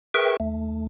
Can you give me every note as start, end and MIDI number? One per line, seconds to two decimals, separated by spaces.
0.14 0.37 68
0.14 0.37 70
0.14 0.37 71
0.14 0.37 76
0.14 0.37 79
0.14 0.37 85
0.40 0.87 39
0.40 0.87 57